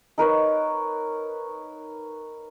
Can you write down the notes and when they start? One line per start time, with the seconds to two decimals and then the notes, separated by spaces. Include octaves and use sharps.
0.18 D#4 A#4 B4 C#5